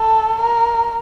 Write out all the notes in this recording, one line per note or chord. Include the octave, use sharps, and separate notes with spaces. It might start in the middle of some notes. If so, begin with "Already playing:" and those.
Already playing: A4
A#4